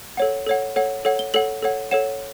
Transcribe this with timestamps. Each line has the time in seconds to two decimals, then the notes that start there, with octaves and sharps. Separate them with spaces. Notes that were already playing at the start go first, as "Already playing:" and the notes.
0.17 A4 C#5 F#5
0.47 A4 C#5 F#5
0.76 A4 C#5 F#5
1.05 A4 C#5 F#5
1.19 G7
1.34 A4 C#5 F#5 F#7
1.63 A4 C#5 F#5
1.91 A4 C#5 F#5 E7